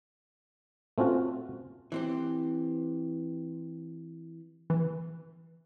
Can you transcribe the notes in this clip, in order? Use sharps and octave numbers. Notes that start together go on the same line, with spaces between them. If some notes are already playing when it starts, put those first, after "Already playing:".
A3 C4 C#4 F4 F#4
E3 C4 G4
E3